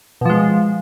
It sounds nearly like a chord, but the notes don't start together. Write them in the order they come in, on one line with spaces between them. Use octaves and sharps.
B2 F3 G#3